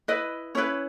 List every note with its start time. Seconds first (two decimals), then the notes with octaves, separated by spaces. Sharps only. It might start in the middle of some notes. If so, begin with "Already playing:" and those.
0.08 E4 B4 D#5
0.55 C#4 E4 B4 C#5